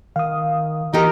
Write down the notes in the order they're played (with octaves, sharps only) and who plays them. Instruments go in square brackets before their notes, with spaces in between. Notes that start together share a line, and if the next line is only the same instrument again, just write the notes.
[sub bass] D#3 [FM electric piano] F5 D#6
[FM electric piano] E3 [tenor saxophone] D#4 [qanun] G4 A#4